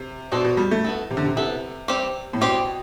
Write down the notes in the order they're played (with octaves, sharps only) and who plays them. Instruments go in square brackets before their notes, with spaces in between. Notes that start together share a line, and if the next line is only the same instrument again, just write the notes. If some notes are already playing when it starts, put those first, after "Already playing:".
Already playing: [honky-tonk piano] C3
[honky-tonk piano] B2 [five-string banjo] D4 A4 C5
[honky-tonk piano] B2
G3
A3
[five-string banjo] B3 E4 A4
[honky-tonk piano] C3
D3
C3
[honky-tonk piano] C3 [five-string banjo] B3 E4 A4
[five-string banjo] G3 C4 G4
[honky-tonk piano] A2
[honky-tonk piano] B2 [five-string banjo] G3 C4 G4